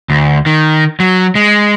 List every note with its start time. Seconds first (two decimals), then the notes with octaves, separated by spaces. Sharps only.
0.10 D2
0.46 D#3
1.00 F#3
1.35 G#3